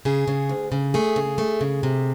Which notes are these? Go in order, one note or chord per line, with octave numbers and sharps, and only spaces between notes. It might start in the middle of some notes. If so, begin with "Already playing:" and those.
C#3 G#4
C#3
D2
C#3
A3 G#4
C#3
A3
C#3
C3